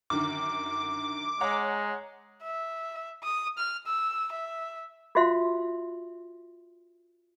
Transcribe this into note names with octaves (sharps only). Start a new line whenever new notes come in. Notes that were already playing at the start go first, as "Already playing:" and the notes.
F#2 D3 D#3 D6
G#3 C#5 F#5 A#5
E5
D#6
F6
E6
E5
F4 F#4 C5 E5 F5 C6